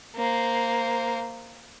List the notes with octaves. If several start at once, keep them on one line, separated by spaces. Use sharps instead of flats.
A#3 C5